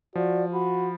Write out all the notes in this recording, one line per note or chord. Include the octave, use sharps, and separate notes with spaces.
F3 F#4 D5
F#4 B5